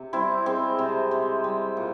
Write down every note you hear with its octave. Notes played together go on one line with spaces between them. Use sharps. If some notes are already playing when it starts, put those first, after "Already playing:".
Already playing: C3
G3 C4 E4
G#3 C4
C3
C3
G3
A#2